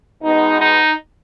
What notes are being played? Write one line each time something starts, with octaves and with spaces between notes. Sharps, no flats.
B2 G#3 B3 D#4
D#4